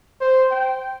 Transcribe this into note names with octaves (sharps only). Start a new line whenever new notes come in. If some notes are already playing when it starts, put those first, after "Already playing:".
C5
G5